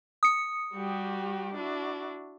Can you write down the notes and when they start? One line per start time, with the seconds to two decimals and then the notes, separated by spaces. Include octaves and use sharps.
0.23 D#6 C#7
0.74 G3 F#4 G4
1.54 D4 E4 F#4